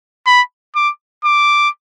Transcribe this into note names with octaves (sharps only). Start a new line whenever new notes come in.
B5
D6
D6